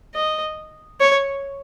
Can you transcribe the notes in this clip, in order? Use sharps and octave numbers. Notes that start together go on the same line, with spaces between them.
D#5
C#5